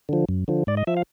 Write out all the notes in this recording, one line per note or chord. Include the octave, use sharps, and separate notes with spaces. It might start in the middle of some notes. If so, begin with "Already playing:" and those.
D3 F3
F#2
D3 F3
G#2 D5
D#5
F3 E5
F5